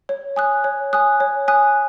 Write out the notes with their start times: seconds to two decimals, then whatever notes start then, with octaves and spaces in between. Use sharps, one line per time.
0.09 C#5
0.36 G#5 D#6 F#6
0.64 C#5
0.93 G#5 D#6 F#6
1.20 C#5
1.48 G#5 D#6 F#6